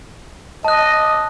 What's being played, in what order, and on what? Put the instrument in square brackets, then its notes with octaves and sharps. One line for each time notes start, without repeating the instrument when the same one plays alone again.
[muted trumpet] D#5 [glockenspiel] A5 F#6